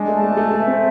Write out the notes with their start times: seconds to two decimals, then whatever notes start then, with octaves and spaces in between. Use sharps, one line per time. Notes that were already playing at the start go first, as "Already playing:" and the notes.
Already playing: G#3 D4
0.08 A3
0.15 A5
0.23 A3
0.37 A3 A4
0.52 A3
0.59 E5
0.67 C4